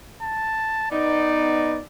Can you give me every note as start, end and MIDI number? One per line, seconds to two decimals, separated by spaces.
0.22 0.87 81
0.91 1.76 59
0.91 1.76 63
0.91 1.85 74